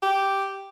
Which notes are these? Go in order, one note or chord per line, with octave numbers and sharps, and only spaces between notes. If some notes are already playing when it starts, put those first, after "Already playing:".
G4